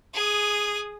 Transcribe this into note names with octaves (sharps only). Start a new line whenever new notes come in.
G#4 D#6